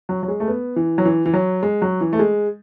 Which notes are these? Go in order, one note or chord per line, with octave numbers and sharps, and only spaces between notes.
F#3
F#3
G#3
A3
B3
E3
F#3
E3
E3
F#3
G#3
F#3
E3
A3
G#3